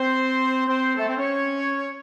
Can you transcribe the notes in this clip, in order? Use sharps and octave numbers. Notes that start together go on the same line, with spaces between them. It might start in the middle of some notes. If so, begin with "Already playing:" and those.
Already playing: C4 C5
C4 C5
A3 A4
C4 C5
C#4 C#5